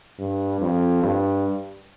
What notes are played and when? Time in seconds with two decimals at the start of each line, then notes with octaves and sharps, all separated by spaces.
0.19 G2
0.61 F2
1.02 G2